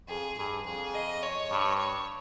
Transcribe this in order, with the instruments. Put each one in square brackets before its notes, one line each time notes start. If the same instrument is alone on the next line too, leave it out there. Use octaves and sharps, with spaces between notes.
[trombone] F2 [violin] G#4
[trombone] G2 [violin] G#4
[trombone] F2 [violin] G#4
[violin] D#5
C#5
[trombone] G2
[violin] C#5